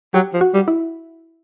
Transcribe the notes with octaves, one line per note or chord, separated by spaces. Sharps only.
F#3 G4
F3
F#4
G3
E4